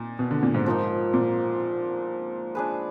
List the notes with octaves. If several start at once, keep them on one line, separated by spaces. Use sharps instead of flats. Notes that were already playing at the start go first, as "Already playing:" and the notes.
Already playing: A#2 D#4
B2
D3
A#2
G#2
F3 A#3 D#4
A#2
D4 G#4 B4